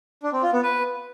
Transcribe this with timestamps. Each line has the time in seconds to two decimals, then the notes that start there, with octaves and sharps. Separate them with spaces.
0.23 D4
0.33 C4
0.43 F4
0.53 B3
0.63 B4